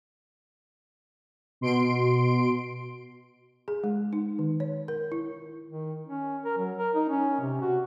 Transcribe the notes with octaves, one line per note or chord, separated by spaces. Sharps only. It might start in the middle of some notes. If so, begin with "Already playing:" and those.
B2 C6 D7
G#4
G#3
D#4
D#3
C#5
A#4
E4
D#3
C#4
A#4
F#3
A#4
D#4
C#4
C3
F#4